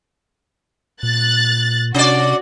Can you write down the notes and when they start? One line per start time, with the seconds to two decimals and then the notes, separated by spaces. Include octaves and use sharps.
1.03 A#2 F#6 A6
1.94 C3 C#4 F#4 D5